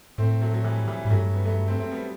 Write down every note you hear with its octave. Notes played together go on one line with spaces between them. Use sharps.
A2 A3 C4
F#3 A3
F#3
E3 G3
E3 G3
A2 G3
G2 F#3 A3
G3 B3
F#3 A3
A3 C4
A3 C4
G3 B3